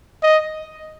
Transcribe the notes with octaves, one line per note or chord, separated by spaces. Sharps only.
D#5